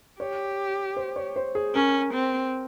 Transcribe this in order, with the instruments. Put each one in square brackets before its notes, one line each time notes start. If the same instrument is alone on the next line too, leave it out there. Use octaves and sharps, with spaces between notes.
[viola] G4 [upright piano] C#5
[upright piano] C5
C#5
C5
G#4
[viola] C#4 [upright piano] A#4
[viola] C4